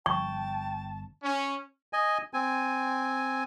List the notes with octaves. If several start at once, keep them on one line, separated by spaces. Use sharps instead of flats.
G1 G5 A5 C#6
C#4
D#5 G#5
C4 G#5